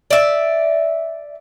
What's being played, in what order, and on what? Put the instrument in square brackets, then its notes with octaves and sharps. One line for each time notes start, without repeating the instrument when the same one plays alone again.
[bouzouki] D5 E5